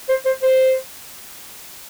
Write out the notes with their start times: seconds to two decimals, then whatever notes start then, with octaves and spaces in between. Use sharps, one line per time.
0.09 C5
0.26 C5
0.43 C5